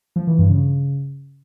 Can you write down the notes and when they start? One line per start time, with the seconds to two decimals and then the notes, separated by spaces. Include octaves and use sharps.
0.16 F3
0.27 E3
0.38 G2
0.50 C#3